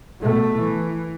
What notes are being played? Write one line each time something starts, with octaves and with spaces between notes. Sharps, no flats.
B2 A3
E3